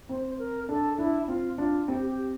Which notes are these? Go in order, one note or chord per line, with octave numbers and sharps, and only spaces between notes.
C4 C5
A#4
D4 A4
D4 E4
C4 F4
D4 F4
C4 G4
G4